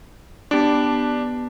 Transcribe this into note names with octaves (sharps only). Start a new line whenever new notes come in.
B3 D4 G4 A5 D6